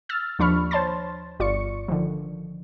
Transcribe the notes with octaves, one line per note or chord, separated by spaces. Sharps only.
E6 F6 A6
D#2 F3 D4 B5 C#6 F6
C5 C#5 A5 C6 A6
G1 F4 D5 C#6 C#7
D3 D#3 F3